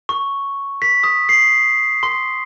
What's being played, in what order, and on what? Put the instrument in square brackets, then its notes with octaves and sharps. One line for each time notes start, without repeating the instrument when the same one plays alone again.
[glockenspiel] C#6
B6
D#6
C7
C6